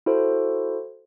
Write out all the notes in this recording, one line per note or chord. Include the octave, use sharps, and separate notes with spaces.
E4 F#4 A4 C5